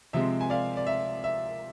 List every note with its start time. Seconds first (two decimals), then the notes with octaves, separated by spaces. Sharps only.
0.13 C3 F3 G#3 C4 E5
0.41 G#5
0.50 D5 F5
0.77 D5
0.87 E5
1.24 E5